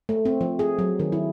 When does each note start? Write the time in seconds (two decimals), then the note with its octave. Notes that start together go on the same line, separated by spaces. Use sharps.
0.09 A3
0.25 C4
0.41 F3
0.59 G#4
0.79 F#3
1.00 D#3
1.12 E4